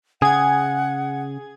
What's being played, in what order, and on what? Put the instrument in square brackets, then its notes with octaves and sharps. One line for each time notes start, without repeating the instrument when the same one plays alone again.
[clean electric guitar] C#3 [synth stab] G#4 G#6 [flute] F#5